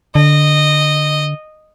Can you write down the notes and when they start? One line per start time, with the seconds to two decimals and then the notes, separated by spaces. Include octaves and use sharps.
0.15 D3 D#5